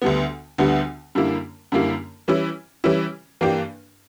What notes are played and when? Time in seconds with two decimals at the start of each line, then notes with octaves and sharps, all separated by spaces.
0.02 D2 D3 G3 B3
0.58 D2 D3 G3 B3
1.15 F#2 D3 G3 A#3 E4
1.72 F#2 D3 G3 A#3 E4
2.28 E3 G3 C#4 E4
2.84 E3 G3 C#4 E4
3.41 G2 E3 A#3 D4 G4